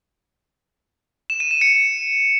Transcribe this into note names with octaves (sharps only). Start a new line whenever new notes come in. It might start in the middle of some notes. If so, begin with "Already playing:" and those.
E7
D#7
E7
C#7